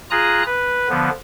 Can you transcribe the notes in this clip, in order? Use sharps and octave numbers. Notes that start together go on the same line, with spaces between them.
F4 G#4 A#5 D#6 F#6
B4
D3 F3 B3